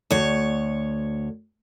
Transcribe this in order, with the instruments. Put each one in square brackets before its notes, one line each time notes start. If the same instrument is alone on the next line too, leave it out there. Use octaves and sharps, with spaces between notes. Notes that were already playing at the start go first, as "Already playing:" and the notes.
[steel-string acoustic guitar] D2 C#5